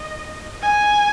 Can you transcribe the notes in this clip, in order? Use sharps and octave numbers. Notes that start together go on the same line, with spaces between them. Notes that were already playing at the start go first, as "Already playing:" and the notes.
Already playing: D#5
G#5